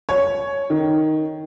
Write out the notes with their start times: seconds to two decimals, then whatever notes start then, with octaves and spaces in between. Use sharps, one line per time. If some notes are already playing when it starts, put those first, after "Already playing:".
0.09 C#5
0.70 D#3